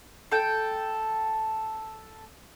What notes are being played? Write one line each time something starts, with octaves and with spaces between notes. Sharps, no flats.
A4 G5